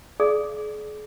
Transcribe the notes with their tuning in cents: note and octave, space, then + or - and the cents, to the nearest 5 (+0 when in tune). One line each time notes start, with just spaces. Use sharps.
G#4 +35 D5 +0 D#6 +0